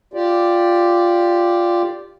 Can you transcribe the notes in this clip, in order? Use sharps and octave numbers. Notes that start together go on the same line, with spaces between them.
F4 G4 D5